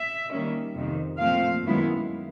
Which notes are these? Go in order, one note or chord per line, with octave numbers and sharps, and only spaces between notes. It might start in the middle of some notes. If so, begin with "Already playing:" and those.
Already playing: E5
D#3 G3 A#3 C#4
F2 C3 D#3
A#2 F3 A3 C4 F4 F5
F#2 D#3 G#3 B3 E4